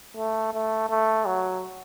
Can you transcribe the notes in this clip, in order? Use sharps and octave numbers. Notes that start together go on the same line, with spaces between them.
A3
A3
A3
F#3